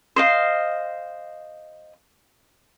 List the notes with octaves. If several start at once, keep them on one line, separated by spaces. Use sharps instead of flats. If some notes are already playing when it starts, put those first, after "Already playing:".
C5 D#5 F5